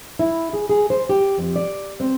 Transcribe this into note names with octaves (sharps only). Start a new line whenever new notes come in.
E4
G#4
G#4
C5
G4
F2
D5
C4